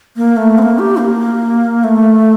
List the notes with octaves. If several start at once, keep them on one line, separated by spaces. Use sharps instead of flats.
A#3
A3
C4
A#3
G4
A#3
A3